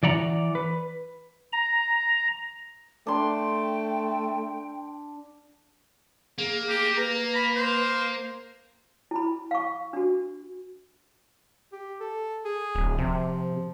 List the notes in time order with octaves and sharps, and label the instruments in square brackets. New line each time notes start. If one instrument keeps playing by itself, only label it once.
[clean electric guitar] E3 D5 F#5 A#5
B4
[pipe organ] A#5
[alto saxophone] A3 [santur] D4 C6 [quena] G5
[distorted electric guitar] A#3 [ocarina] G#4
[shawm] G4 [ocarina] G#4
[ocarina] B4 [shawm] A#5
[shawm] B5
C5
[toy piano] E4 B5
F5 C#6
D4 F#4
[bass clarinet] G4
A4
G#4
[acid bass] D1
[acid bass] C3 [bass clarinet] F3